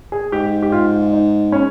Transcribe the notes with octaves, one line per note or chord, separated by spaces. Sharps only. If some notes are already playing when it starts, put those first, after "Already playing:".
G#4
G#2 G4
G4
F4
D#4
C#4